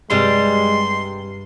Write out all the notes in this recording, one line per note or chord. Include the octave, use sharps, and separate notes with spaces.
G2 C3 G3 G#3 C6